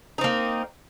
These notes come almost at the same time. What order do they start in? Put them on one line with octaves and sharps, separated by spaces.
D#4 C4 A#3